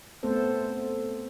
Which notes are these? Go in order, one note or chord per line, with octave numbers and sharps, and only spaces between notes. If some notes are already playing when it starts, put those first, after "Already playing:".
A3 B3 C4 A4 C5